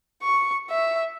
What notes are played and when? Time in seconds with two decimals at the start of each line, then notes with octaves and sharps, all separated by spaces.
0.23 C#6
0.70 E5